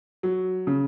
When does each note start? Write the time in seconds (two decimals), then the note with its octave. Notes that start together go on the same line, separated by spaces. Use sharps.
0.23 F#3
0.67 C#3